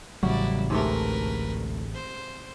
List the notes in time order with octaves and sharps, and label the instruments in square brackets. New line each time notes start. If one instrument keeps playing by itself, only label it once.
[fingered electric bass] A1 [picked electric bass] C#3 F#3 G3 [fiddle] E4 D5 [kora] F#4
[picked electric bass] D2 [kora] G#2 C3 A3 [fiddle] A#4 B4
[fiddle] C5